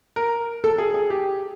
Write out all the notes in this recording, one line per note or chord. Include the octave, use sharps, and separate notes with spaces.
A#4
A4
G#4
G#4
G4